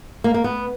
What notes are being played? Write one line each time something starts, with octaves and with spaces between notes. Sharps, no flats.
A#3
A#3
B3